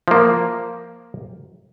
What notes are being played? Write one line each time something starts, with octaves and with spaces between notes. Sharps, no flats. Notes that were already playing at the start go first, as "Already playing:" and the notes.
F3 A#3